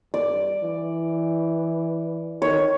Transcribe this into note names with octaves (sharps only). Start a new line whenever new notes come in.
G2 D5
E3
D#3 C#5